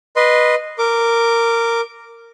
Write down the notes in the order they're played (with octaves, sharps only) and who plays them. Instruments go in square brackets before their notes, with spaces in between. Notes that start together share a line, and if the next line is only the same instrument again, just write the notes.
[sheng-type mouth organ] B4 D#5 C6
A#4 D6